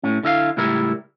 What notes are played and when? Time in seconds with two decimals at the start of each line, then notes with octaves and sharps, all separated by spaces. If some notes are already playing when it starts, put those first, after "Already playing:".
0.03 A2 C#4
0.23 D3 E4 D#5 F5
0.57 C#2 A2 G3 E4 A#4